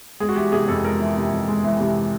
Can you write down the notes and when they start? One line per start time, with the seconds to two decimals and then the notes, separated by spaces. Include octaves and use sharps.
0.20 G#3 G#4
0.29 F#4
0.36 E3 G4
0.52 C3 G#4
0.68 F2 A4
0.84 G#3 A#4
1.00 E3
1.16 C3
1.32 F2
1.48 G#3
1.64 E3
1.80 C3